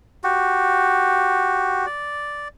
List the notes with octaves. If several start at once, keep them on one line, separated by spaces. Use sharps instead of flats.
F#4 G4
D5